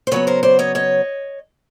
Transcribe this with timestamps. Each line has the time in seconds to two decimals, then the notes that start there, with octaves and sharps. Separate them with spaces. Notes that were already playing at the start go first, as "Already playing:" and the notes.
0.07 C5
0.11 C#3 F#3 B3 B4 C#5
0.27 A#4 C5
0.43 C5 D5
0.59 C#5 D#5
0.75 C#5 D#5